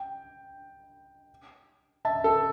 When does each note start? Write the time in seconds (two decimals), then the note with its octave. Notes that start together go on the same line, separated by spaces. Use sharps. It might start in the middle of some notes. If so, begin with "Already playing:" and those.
Already playing: G5
2.05 E5 A5
2.24 A4